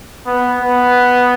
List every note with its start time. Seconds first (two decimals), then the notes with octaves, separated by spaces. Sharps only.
0.27 B3
0.61 B3